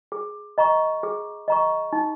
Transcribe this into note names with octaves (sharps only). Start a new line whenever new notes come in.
G#4
D#5 A#5 C#6
G#4
D#5 A#5 C#6
D#4